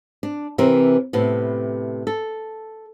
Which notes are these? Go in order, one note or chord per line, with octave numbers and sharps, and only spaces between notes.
D4
C3 E3 C4 A#4
A2 C3 B3
A4